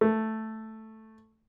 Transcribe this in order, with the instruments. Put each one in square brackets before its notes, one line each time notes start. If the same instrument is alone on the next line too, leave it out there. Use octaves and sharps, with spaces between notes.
[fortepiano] A3